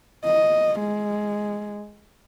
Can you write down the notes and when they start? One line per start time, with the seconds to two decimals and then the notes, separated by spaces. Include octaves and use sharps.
0.24 D#5
0.80 G#3